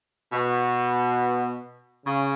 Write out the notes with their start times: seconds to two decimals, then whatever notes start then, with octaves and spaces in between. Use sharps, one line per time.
0.33 B2
2.06 C#3